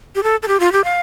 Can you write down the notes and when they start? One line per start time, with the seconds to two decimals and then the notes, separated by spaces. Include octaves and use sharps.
0.15 G4
0.23 A4
0.43 A4
0.48 G4
0.60 F4
0.72 G4
0.84 F5